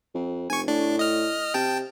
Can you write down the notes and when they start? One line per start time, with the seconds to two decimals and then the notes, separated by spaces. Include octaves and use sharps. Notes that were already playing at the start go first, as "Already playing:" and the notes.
0.15 F2
0.50 F1 G#5 C#6
0.68 A2 D4
0.99 D#5 F6
1.54 C3 G5 A5